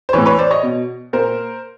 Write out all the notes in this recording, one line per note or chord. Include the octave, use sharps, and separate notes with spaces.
C5
A2 E3 B4 C#5
B4 C#5
C5 D5
C#5 D#5
B2
A#2 A#4 C5